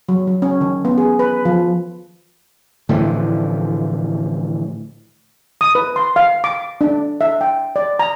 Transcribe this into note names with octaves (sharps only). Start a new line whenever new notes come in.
F#3
F#3
C#4
D#3
B3
G#4
B4
F3
A2 D3 E3 F3
D#6
B4
C6
F5
D6
D4
E5
G5
D5
A#5